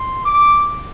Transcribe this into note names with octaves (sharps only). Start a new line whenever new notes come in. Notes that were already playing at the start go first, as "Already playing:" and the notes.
Already playing: C6
D6